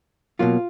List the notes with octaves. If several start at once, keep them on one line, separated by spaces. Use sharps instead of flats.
B2 F#3 A#3 F4